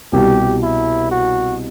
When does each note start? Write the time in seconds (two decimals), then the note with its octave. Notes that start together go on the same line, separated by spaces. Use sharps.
0.13 C2 B2 G3 G4
0.62 E4
1.11 F#4